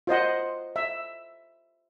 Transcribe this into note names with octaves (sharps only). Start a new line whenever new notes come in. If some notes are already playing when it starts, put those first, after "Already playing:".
F4 C5 D#5 F#5
E5